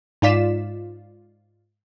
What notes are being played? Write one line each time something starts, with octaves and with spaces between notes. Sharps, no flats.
G#2 D#4 F4 D5 B6 E7